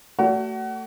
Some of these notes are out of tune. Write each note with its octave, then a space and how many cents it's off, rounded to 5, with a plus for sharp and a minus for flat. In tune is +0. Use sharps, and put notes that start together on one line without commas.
A3 +30 F#4 +30 D5 -35